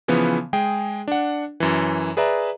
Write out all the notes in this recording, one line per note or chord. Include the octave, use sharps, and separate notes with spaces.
C#3 E3 F3 B3
G#3 G#4 G5
D4 F#5
F#2 E3
G#4 B4 D5 E5 A#5